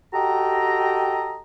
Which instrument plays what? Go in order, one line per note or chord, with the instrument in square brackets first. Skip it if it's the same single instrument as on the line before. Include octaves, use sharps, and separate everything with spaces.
[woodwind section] F#4 G4 A4 D#5 G5 A#5